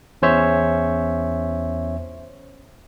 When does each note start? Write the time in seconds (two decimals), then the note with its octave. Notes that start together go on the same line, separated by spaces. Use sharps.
0.22 E2 C#4 C5 C#5 E5